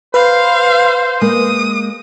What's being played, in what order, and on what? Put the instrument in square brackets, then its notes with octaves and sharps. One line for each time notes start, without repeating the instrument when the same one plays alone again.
[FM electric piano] B4 [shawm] C5 [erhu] F5
[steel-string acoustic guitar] G#3 A#3 [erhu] D#6